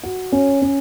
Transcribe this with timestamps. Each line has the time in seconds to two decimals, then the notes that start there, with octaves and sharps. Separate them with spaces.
0.03 F#4
0.32 C#4
0.62 C#4